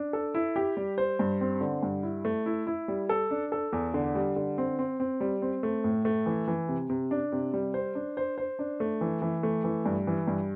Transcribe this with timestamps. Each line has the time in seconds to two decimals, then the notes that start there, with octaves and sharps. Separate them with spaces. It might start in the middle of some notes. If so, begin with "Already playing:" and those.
Already playing: D4
0.13 A4
0.35 E4
0.56 G4
0.77 G3
0.98 C5
1.19 G2
1.41 C4
1.61 D3
1.83 G2
2.03 E4
2.25 A3
2.46 E4
2.67 E4
2.88 G3
3.09 A4
3.31 D4
3.52 A4
3.73 E2
3.94 D3
4.15 G3
4.36 D3
4.58 C4
4.79 C4
5.00 C4
5.20 G3
5.42 C4
5.63 A3
5.84 A2
6.05 A3
6.26 E3
6.48 E3
6.68 C3
6.90 C3
7.11 D4
7.32 C3
7.54 G3
7.74 C5
7.95 D4
8.17 C5
8.38 C5
8.59 D4
8.80 A3
9.01 E3
9.22 E3
9.43 A3
9.64 E3
9.86 G2
10.07 E3
10.28 G2